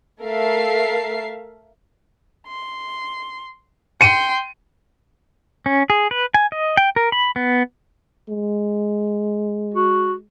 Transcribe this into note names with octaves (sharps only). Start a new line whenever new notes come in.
A3 A4 A#4 E5 F5 C7
C6
G5 C6 C#7 D#7
C#4
G#4
B4
G#5
D#5
G5
A#4
B5
B3
G#3
F#4